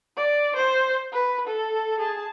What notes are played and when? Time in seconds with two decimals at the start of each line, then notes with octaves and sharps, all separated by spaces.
0.17 D5
0.56 C5
1.13 B4
1.47 A4
2.00 G#4 A5